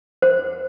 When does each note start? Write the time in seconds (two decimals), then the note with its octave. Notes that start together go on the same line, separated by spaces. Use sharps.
0.22 C5